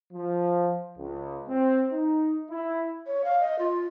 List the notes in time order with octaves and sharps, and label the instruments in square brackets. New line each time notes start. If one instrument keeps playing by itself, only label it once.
[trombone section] F3
C#2
C4
D#4
E4
[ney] C#5
F5
D#5
F4